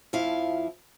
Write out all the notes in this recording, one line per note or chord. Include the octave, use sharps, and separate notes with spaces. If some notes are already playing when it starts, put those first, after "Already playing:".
F2 F3 E4 F5